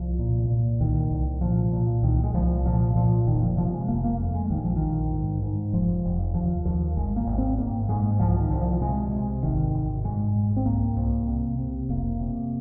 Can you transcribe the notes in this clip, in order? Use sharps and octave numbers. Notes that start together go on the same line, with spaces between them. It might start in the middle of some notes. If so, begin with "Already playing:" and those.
Already playing: C2 F3
A#2
A#2
C2 D#3
C2
A#2 F3
A#2
C2 D#3
G#3
C2 F3
A#2 F3
A#2 F3
F1 D#3
F3
C3 F3
G#3
F1 A#3
A#3
F2
G#3
A#1 D#3
F3
A#1 D#3
G#2
G#2
F1 F3
F1
D#2 F3
D#2 F3
G#1 G#3
A#3
G#1
C4
G#2 A#3
G#2 G#3
C2 F3
D#3
C2
F3
C3 G#3
C3
G#1 D#3
G#1
G#2 G#3
G#2
C4
C2 A#3
C2
C3
C3
F1 A#3
C3